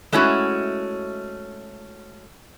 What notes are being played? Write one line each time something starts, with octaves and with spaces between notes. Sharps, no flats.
G#3 A3 C#4 E4 F#4